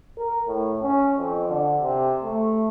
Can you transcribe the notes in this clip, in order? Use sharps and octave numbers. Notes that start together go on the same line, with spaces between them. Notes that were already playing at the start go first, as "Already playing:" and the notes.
A#4
A2
C#4
F2
D3
C3
A3